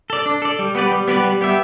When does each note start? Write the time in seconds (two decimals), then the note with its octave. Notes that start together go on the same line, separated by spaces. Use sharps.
0.10 A4 D5
0.26 D4
0.42 A4 D5
0.59 G3
0.75 B3 G4 B4 D5
0.92 G3
1.08 B3 G4 B4 D5
1.24 G3
1.41 B3 G4 E5